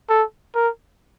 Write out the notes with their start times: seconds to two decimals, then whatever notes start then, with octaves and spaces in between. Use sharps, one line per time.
0.09 A4
0.55 A#4